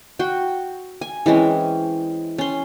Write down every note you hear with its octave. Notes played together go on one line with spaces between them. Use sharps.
F#4 G5
G#5
E3 G#3 C4 C#4
C#4 C6